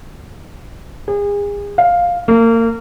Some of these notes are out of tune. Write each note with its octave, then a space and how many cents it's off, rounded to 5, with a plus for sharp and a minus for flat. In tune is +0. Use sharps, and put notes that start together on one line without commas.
G#4 -35
F5 +5
A#3 -30